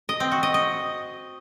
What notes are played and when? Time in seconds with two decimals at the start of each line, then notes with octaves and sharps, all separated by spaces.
0.09 D#5
0.20 C4
0.32 F#4
0.43 D#5
0.54 D#5